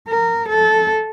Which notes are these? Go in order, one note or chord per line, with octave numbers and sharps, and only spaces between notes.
A#4
A4